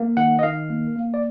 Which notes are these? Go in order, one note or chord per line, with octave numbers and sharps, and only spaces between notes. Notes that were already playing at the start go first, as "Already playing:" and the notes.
Already playing: A#3
D#3 F#5
D#5
D#3 F5
A#3
A#3
D5